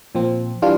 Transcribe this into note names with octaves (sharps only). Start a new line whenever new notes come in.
A#2 F3 C4
E3 G3 D4 F4